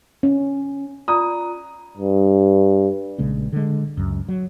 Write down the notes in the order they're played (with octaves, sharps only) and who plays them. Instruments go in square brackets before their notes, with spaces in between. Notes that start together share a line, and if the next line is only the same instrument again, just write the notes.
[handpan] C#4
[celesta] F4 D5 A#5 [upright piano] D#6
[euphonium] G2
[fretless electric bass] A#1 C#3 G#3 C#4
D3 G#3
C#2 F#2
F#3